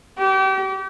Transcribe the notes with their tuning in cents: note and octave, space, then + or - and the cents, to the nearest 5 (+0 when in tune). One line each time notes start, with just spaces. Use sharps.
G4 -35